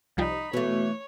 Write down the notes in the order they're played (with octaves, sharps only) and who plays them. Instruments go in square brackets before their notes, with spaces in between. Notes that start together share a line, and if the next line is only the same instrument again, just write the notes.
[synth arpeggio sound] C2 F3 G3 [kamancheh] D#4 B5
[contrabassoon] B2 [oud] E3 A3 [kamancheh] C#5